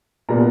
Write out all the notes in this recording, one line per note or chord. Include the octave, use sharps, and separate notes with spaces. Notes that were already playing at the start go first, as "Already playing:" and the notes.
A#2 G3 B3 A#5